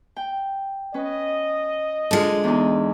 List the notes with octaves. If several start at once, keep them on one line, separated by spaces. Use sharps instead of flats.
G5
C#4 B4 D#5
D3 G#3 F4 A4
E2 D4 D#4